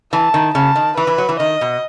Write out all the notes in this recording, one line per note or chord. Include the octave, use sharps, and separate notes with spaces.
E3 A5
D#3
C#3 A5
D#3
E3 B4
E3
F#3
E3
D#3 D#5
B2